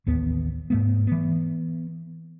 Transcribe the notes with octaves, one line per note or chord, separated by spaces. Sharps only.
A1 D#2 B3
G#2 A3 B3
E3 B3